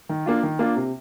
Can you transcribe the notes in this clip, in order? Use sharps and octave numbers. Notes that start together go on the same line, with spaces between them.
D#3
A#3 D4 F4
D#3
A#3 D4 F4
C3